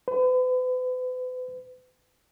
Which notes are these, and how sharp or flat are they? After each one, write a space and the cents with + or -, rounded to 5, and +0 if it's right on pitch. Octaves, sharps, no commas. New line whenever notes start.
B4 +40